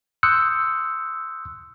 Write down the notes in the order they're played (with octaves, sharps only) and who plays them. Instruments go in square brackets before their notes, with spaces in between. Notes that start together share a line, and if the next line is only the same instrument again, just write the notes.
[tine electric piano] C6 D#6 E6 F#6 G6 C#7